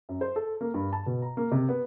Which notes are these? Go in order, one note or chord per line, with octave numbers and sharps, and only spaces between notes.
F#2
C5
A4
A#3
G2
A5
B2
A#5
A#3
C3
B3